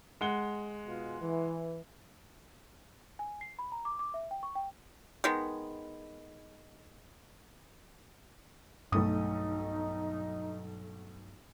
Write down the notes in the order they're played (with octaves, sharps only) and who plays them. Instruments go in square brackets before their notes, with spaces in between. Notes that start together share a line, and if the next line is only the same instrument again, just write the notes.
[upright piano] G#3 F#5 G7
[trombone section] B2 F4 G#4
E3
[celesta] G#5
C7
B5
A#5
D6
D6
E5
G5
C#6
G5
[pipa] D#3 G#3 B3
[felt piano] B1 A3 D#6 [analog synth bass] G2 [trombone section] D#4